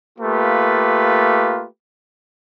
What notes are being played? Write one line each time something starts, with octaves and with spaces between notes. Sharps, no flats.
A3 A#3 F4 G4 B4